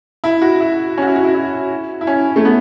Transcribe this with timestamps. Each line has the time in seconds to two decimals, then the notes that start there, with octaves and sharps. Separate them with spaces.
0.24 E4
0.42 F#4
0.60 E4
0.97 C#4
1.02 F#4
1.07 E4
1.16 F#4
1.24 E4
1.35 E4
2.01 E4
2.07 C#4
2.36 A3
2.45 B3